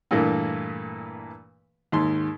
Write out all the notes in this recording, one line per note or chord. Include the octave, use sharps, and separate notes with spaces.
G2 A#2 E3 A3 A#3
D#2 G#2 C6